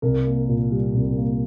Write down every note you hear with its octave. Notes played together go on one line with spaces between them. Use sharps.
C2 A#4
A#3
A#2
G3
C2
A#3